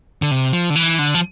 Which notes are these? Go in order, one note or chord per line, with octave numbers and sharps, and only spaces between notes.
D3
C3
F3
D3
E3
D3
F3